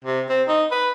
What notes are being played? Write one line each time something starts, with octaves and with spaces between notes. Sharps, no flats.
C3
C4
D#4
B4